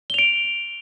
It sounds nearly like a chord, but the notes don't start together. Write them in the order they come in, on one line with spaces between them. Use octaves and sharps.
G7 F7 D7